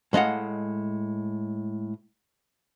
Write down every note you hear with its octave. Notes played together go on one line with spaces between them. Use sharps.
A2 G#3 D#5 F5 F#5